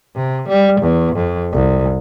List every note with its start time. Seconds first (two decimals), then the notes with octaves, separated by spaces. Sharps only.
0.16 C3
0.49 G3
0.81 E2
1.16 F2
1.53 C2